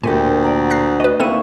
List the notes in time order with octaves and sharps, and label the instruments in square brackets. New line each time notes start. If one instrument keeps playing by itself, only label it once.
[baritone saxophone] D2 [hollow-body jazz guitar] A#2 A3 G4 [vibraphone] A#4 [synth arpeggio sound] G#5
[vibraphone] D5 F#5 A#5
[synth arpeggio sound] F#6 A#6 C7
[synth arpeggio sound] F#4 B4 [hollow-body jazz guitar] D#5
[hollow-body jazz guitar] A#3 D#4 E4 [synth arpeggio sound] C4 A4 D#7 [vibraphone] F5 C#6